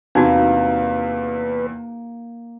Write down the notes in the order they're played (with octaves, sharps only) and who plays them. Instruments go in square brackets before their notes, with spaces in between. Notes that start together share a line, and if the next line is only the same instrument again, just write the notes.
[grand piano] E2 C3 [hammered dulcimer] A#3 [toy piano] D4 D#4 F#4 [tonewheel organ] B4